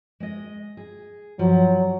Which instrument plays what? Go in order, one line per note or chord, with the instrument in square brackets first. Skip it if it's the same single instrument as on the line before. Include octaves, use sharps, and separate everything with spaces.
[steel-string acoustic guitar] G#3 D#5
G#4
[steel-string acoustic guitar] G2 F3 [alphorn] F#3